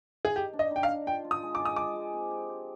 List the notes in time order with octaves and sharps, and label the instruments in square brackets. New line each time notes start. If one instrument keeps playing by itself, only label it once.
[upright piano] G#4
[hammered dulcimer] D#3 [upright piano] G4
[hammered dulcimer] D4
[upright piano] D#5
[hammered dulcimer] D#3 [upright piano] G5
[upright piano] F5
[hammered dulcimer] D4
[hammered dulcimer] F4 [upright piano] G5
[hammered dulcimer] F4
[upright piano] D#6
[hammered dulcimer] G#3
[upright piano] D6
[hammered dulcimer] F4
[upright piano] D#6
[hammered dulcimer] G#3 [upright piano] D6
[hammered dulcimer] G#3
C4
G4
G4